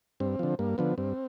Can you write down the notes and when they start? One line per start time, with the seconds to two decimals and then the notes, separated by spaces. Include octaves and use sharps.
0.20 G2 C4
0.39 D3 F3
0.59 G2 A#3
0.78 D3 F3 B3
0.98 G2 C4